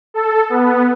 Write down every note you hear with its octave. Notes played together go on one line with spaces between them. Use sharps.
A4
B3